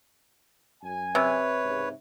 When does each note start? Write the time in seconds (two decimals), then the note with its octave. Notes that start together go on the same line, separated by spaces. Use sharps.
0.82 F#2 G#5
1.15 C3 B4 C#5
1.64 G#2 C#3